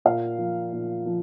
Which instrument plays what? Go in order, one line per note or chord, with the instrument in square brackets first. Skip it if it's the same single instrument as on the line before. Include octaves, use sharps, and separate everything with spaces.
[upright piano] A#2 F5
F3
A#2
F3